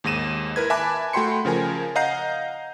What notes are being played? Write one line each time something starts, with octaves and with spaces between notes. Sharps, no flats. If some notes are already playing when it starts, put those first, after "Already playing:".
D#2 G#2 A#6 D#7 E7
E4 A#4 B4 G#6
E5 G#5 A5 B5 D6 F#6
A3 F#4 G5 B5 C6 C#7
C#3 F3 A#4 G#5
D#5 F5 F#5 A#5 G6 C7